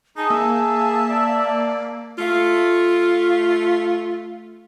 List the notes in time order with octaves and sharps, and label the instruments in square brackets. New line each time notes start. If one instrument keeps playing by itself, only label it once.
[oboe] D#4 [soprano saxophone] G#4 [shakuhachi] A5
[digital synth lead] A#3 [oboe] E5
[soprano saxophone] D5
[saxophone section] A3 F4